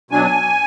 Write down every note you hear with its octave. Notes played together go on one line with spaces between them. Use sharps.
B2 F#3 D4 G#5